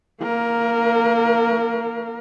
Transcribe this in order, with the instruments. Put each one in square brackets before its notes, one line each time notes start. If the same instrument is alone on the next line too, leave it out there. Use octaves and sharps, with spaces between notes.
[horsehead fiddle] A#3 A#4